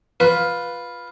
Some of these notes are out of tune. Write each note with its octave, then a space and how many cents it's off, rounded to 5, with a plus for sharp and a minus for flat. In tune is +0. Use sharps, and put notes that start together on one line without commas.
F4 +10 B4 +0